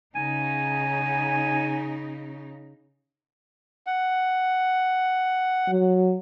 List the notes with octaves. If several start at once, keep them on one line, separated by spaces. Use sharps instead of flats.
C#3 D#4 G#5
F#5
F#3